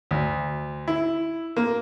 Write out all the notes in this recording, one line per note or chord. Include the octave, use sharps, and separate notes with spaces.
D2
E4
A#3